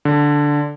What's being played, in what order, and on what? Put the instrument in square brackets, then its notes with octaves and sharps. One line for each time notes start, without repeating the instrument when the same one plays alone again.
[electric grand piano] D3